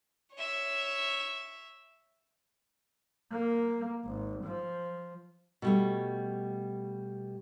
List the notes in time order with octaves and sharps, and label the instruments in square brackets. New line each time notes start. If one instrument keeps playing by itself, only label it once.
[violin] C#5 E5
[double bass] A#3
G#1
F3
[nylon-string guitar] B2 G3 A3